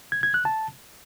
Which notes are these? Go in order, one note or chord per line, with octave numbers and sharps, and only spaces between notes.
G#6
G#6
F#6
A5